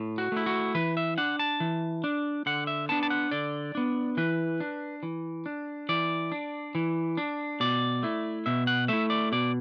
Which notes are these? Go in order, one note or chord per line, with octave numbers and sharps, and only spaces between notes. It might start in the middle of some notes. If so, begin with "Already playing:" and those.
Already playing: A2
F#4
A3 E4
F#4
E3 B4
E5
D4 F#5
A5
E3
D4
D3 F#5
E5
B3 D4 A5
A5
F#5
D3 D5
B3 D4
E3 B4
D4
E3
D4
E3 D5
D4
E3
D4
B2 D5
A3 E4
B2 E5
F#5
A3 E4 E5
D5
B2 D5